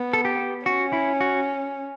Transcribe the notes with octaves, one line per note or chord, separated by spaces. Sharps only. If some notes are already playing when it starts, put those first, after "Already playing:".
Already playing: B3
A4
G4
C#4 F#4
E4
F#4